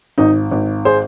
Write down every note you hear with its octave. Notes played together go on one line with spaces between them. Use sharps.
G#1 D#4
G#1
G#4 C5